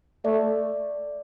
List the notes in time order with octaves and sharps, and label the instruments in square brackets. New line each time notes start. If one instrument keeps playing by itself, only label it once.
[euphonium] A3 [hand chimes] D5